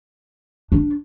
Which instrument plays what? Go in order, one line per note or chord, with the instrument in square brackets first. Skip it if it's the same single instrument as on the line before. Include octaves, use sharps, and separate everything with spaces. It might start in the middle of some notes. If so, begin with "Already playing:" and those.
[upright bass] D4